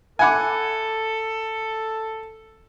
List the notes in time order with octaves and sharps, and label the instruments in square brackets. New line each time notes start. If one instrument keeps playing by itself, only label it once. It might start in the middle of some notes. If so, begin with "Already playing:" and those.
[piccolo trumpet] A4 [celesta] E5 B5 D6 [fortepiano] F#5 G#5